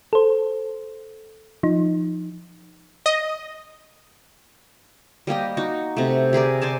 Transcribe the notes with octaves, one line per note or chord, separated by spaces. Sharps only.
A4 C5
F3 D#4
D#5
G3 A#3 G4 D#5
D#4 F#4
C3 A3
G4 G#4 A#4 D5
C5 D5 G#5 A5